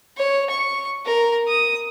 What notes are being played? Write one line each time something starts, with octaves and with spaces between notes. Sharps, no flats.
C#5
C#6
A#4
D#6